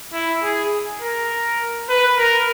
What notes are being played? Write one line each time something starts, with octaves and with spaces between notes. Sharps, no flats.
E4
G#4
A#4
B4
A#4